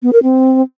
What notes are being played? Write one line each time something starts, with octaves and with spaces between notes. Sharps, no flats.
B3
A#4
C4